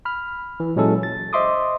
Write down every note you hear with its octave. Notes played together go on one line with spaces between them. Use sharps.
B5 F6
E3
A#2 F#3 G#3 C#4 E4 A4
A6
C5 D#5 E5 C6 D6 D#6